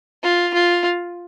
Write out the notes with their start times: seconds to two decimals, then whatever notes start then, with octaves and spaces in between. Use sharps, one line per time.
0.23 F4
0.54 F4